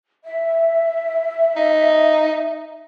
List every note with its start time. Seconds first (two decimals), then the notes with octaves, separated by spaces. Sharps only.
0.24 E5
1.56 D#4